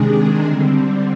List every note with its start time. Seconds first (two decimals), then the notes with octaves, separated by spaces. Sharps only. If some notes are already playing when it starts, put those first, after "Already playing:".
Already playing: C3 D#3 G#3 D4 G#4
0.45 D3 G3 C4